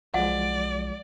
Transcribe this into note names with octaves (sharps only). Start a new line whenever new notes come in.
B1 F3 F#3 G#3 D5 F#5